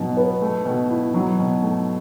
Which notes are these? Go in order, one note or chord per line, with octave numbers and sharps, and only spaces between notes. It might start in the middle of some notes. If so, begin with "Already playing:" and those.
Already playing: B2 F#3
B3
A3
B2
E4
F#3
B2
A3